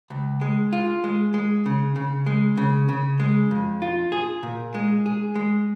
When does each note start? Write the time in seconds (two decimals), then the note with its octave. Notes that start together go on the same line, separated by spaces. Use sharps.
0.10 C#2
0.41 G#3
0.73 F4
1.04 G#3
1.34 G#3
1.66 C#3
1.96 C#3
2.26 G#3
2.57 C#3
2.89 C#3
3.20 G#3
3.51 F2
3.82 F4
4.12 G#4
4.43 A#2
4.75 G#3
5.06 G#4
5.35 G#3